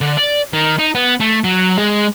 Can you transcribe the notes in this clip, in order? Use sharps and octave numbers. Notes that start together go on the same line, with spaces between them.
D3
D5
D#3
D#4
B3
A3
F#3
G#3